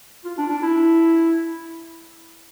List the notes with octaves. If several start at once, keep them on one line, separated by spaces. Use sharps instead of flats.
F4
D4
D4
E4